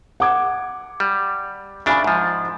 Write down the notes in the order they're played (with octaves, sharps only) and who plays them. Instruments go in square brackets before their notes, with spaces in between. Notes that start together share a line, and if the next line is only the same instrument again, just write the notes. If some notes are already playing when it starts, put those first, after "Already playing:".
[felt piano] F#5 D6 G#6
[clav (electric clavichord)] G3
[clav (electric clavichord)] C#3 D4 [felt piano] E5 G#5 B5
[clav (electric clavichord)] G#2 F3